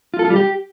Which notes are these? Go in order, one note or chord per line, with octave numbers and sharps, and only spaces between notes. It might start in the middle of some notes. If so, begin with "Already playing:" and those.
F4
A4
F4
G3
G4